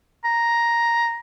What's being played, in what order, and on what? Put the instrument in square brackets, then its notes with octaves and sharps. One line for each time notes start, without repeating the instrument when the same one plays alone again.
[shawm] A#5